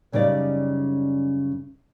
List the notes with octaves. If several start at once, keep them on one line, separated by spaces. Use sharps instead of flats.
F#2 C#3 G3 D#4 D5